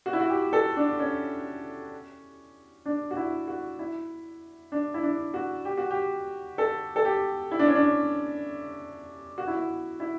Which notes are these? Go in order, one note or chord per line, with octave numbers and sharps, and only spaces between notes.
F#4
E4
F#4
G4
A4
D4
C#4
D4
F#4
E4
F#4
E4
D4
E4
D4
F#4
G4
F#4
G4
A4
A4
G4
E4
D4
C#4
D4
F#4
E4
F#4
E4